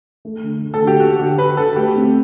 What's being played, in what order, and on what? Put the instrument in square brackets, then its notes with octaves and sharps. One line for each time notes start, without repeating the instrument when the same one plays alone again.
[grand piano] A3
D3
A3
[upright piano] A4
[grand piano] D3
[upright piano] G4
[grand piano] D3 [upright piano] F#4
[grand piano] D3 [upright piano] G4
[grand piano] D3 [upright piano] B4
[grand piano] D3 [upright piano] A4
[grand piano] A3 [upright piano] G4
[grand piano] C4